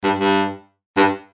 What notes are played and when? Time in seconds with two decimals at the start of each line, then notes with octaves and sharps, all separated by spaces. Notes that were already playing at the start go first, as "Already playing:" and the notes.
0.04 G2
0.19 G2
0.97 G2